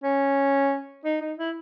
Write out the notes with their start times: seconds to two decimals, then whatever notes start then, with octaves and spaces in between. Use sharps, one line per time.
0.04 C#4
1.05 D#4
1.21 D#4
1.38 E4